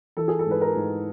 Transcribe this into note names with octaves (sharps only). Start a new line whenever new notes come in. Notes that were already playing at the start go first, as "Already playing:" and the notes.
E3 A4
G#4
A4
G#2 B4
A#4
G#2